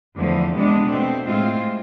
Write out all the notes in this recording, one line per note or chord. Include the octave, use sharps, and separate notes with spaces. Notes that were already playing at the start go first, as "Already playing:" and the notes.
E2 D3 F3 A3
C3 G#3 B3 D4
B2 A3 C4
A2 G#3 C4 F4